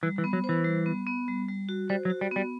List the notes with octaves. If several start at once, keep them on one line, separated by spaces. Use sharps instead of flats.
E3 G3
E3
B3
F#3
C5
E3
G3
B3
B3
G3
G3
F#4
G3 C5
F#3
F#4
G3
G3 B3